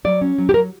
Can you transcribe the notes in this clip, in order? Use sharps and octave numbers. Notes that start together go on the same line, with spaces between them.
F#3 D5
C#4
F#3
G4
F#3 A#4